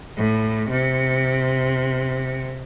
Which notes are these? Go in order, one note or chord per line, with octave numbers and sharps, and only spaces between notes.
A2
C3